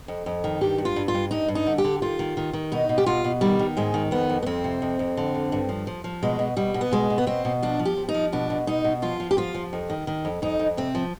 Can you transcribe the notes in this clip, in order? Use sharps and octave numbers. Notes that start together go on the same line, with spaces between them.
F2
F2
D#3
G2 G4
G2
F4
G2
F4
G2
G2 D#4
G2
D#4
D3
G4
D3
D#3 F4
D#3
D#3
D#3
B2 D#4
B2
G4
B2 F4
B2
D#3 G3
D#3
G#2 G#3
D#3
F2 B3
F2
B3
F2 C4
C3
F2
F2
D3
F2
G2
F3
F3
F3
B2 G#3
B2
B2 G3
B2
B3
B2 G#3
B2
B3
B2 C4
B2
F3 D4
F3
G4
F3
D#4
F3
B2 D4
B2
B2 D#4
B2
F3 F4
F3
G4
F3 F4
F3
F2
D#3
D#3
F2
F2 D#4
F2
C3 C4
F3